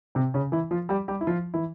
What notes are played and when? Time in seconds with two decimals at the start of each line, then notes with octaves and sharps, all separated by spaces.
0.15 C3 C4
0.34 C#3 C#4
0.52 E3 E4
0.71 F3 F4
0.89 G3 G4
1.08 G3 G4
1.21 E4
1.27 F3 F4
1.54 E3 E4